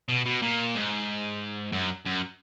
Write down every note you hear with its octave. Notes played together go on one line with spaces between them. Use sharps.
B2
B2
A#2
G#2
F#2
F#2